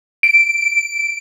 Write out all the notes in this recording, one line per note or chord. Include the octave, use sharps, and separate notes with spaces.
D7